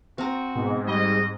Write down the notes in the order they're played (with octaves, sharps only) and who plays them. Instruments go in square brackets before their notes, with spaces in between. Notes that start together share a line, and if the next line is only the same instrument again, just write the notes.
[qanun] C4 A#5 [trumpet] F#4
[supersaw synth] G#2 [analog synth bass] B2
[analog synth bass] G3 [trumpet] D#5